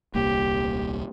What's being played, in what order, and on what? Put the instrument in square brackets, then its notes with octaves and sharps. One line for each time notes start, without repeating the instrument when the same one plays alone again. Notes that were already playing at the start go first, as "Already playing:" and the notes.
[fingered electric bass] D#1 C2 A#3 [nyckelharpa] G4